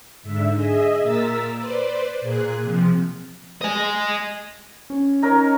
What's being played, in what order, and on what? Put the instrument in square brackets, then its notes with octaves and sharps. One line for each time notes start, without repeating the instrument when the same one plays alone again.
[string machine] G#2 D3 E5
G#4 D#5 E5
A#2 A#4 E6 A6 B6
B4 C5 D5
A#2 G#4 F#6
C3 F3
[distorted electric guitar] D#5 G#5
[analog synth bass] C#4
[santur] D#4 A#4 C#5